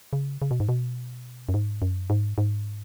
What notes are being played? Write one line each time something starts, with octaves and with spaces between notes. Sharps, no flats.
C#3
C#3
B2
G#2
B2
F#2
G#2
F#2
G#2
G#2